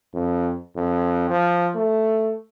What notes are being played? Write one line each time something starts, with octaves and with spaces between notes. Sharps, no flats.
F2
F2
F3
A3